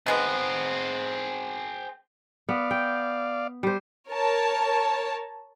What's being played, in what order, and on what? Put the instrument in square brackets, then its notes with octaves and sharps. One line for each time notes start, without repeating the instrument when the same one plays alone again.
[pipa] D#3 G#3 B3 [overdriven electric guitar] C4 G#4
[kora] B3 [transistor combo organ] D5 F5
[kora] G5
G3 C5
[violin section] A#4 C#5 A5